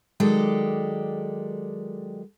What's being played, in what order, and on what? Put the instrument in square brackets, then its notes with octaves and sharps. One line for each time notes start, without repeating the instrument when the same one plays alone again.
[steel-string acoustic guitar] D#3 F#3 G#3 G4 A4 D5